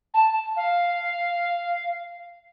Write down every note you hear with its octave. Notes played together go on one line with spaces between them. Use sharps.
A5
F5